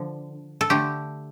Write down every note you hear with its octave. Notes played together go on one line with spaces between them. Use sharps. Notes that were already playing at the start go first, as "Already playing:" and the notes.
Already playing: D3 F3
A4
D3 A3 G4